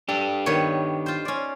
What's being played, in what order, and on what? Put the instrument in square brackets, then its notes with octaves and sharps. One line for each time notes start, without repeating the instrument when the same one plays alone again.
[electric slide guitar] D4 G4 [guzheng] A4
[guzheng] D#3 B3 C#5
F4 C5
C#4 D5